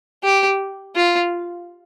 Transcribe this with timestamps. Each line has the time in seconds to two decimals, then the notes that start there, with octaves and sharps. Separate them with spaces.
0.24 G4
0.96 F4